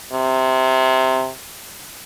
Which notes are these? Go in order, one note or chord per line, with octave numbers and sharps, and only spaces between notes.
C3